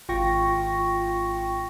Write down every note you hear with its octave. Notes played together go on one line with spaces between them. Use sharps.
G#1 F4 G5 C#6 A#6